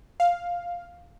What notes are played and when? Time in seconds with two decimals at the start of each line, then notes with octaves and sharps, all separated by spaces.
0.20 F5